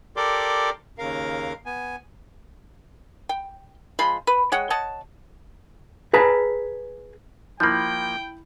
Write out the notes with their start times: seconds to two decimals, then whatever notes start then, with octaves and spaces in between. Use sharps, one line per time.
0.17 G4 A4 A#4 D5 C6 D6
0.99 D#2 C#3 A#4 F5
1.66 B3 G#5
3.29 G5
3.99 F3 G#3 B5 C6
4.27 B4
4.52 G#3 C#5 F#5 G5
4.70 C#5 D#5 F#5 A5
6.13 G#4 B4 A5 A#5
7.60 F3 A#3 E4 G5 B5 G6